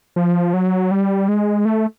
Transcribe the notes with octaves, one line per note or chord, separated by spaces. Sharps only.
F3
F#3
G3
G#3
A3